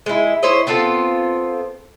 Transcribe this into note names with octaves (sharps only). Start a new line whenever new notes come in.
G#3 E4
E4 C5 C#5 D#5
B3 C4 F4 A4